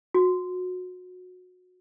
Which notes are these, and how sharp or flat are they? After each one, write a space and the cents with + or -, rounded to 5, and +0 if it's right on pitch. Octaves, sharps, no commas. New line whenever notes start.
F#4 -25